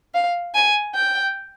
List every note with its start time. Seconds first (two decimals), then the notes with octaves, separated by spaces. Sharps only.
0.14 F5
0.55 G#5
0.95 G5